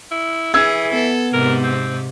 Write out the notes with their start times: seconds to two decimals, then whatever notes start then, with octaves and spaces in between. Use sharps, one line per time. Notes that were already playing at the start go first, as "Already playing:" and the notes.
0.11 E4
0.54 E3 G#4 E6 G#6
0.93 B3 A4
1.33 G#2 C3 A#4
1.64 C4